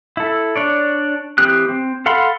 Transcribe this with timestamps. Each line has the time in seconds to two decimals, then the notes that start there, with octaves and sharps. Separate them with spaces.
0.17 E4 A4
0.56 D4 C#5 D5
1.38 E3 C4 G4 D#6 F#6
1.69 C4
2.06 A4 F5 F#5 B5 C6